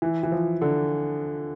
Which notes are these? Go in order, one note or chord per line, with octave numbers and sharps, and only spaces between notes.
E3
E3
F3
D3